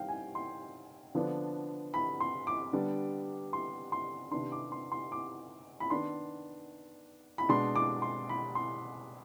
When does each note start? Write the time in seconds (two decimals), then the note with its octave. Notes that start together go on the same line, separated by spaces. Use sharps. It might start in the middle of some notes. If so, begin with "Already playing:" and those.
Already playing: D#3 G3 C4 F5 G5
0.08 G#5
0.35 C6
1.15 D3 F3 B3 D4
1.94 B5
2.20 C6
2.47 D6
2.73 D3 G3 B3 D4
3.53 C6
3.92 C6
4.31 C3 D#3 B3 D4 C6
4.52 D6
4.72 C6
4.92 C6
5.12 D6
5.80 B5
5.90 D#3 B3 D4 C6
7.38 B5
7.49 B2 G#3 D4 C6
7.76 D6
8.02 C6
8.29 B5
8.55 C6